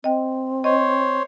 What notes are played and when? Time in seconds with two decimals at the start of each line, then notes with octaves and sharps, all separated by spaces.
0.04 C4 D#5 G5
0.64 C5 C#5 D#5